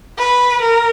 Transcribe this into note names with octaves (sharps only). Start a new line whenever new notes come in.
B4
A#4